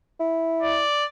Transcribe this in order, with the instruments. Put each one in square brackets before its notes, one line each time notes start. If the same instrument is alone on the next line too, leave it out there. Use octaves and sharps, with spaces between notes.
[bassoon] E4
[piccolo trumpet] D5